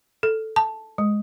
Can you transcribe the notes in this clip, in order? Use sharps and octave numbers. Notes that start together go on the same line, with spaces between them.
A4
A5
G#3